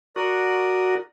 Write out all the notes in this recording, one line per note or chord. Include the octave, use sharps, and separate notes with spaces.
F#4 A#4 D5 D#6